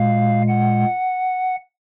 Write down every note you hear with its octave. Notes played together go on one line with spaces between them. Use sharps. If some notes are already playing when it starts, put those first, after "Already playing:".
Already playing: A#2 G#3 F5
F#5